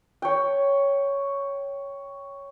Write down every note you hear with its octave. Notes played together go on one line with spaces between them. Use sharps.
C#5 G5